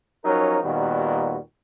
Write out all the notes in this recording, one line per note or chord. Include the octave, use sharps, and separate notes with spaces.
F3 F#3 C#4 D#4 A#4
D#2 A#2 D#3 G3 B3 F#4